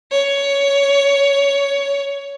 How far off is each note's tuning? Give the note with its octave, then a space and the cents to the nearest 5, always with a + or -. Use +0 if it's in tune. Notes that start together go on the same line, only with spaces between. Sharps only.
C#5 +15